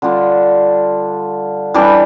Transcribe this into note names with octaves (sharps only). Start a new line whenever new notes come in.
D3 G3 D4 F4
E3 G3 D4 G4